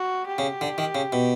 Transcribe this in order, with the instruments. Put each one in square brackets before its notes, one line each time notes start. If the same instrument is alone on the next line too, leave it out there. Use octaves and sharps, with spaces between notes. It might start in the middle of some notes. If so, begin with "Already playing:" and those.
Already playing: [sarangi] F#4
G4
[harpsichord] C#3
D3
D#3
C#3
B2